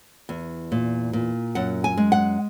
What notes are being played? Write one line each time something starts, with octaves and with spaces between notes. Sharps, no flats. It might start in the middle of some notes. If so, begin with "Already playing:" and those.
E2
A#2
A#2
F#2 F#5
G#5
G#3
F#5